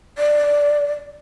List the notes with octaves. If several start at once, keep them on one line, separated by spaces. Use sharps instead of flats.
D5